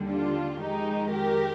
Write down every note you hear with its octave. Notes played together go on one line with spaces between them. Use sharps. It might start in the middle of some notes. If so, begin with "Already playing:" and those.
Already playing: D#2 D3 G3
D4 F4
F2 D#3 G#3 D#4 G4
G4 A#4